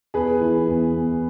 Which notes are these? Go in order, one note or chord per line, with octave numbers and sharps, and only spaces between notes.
E2 G#4 B4
E3
E2
E2